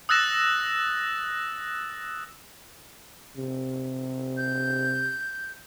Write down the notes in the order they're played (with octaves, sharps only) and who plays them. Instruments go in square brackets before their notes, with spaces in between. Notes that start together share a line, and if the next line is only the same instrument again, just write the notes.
[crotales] D#6 E6 F#6 A6 A#6 E7
[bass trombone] C3
[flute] G6